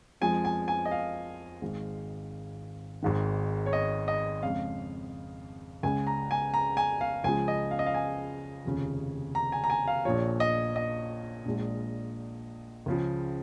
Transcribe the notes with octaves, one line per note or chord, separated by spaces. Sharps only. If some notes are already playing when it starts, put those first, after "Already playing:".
F2 F3 G#3 G#5
G#5
G#5
D#5
F5
G#1 G#2 G#3
G#1 G#2 D#3
C#5
D#5
D#5
F2 C#3 G#3 F5
C#2 C#3 G#3 G#5
A#5
G#5
A#5
G#5
F5
C#2 C#3 F3 G#3 G#5
D#5
F5
D#5
F5
G#5
F1 D#2 C#3 F3
A#5
G#5
A#5
G#5
F5
A#1 A#2 F3 C#5
D#5
D#5
A#1 A#2 G#3
C#2 C#3 F3